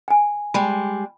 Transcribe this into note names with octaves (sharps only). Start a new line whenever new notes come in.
G5 G#5
G3 G#3 B5